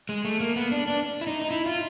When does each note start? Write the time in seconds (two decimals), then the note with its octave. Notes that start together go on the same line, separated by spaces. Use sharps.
0.09 G#3
0.25 A3
0.40 A#3
0.56 B3
0.72 D4
0.88 D4
1.21 E4
1.27 D#4
1.42 D#4
1.51 E4
1.66 F4